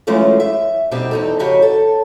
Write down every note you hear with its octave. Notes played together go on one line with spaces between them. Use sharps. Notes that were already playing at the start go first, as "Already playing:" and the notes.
E3 F#3 G#3 A3 C#4 F4
E5
F2 B2 G3 C4 D#4 G4
E2 D#4 A4
F2 C#3 D#4 F#4 G4 C#5
A4